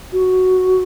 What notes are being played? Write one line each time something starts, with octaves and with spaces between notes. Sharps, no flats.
F#4